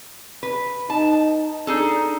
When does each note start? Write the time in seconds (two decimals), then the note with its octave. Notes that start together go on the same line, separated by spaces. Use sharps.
0.43 B4
0.90 D#4 A5
1.67 D4 D#4 G#4 A4